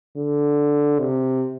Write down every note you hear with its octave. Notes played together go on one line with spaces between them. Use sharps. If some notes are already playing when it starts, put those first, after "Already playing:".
D3
C3